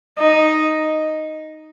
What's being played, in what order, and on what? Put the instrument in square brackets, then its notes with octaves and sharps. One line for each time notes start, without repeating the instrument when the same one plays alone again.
[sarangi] D#4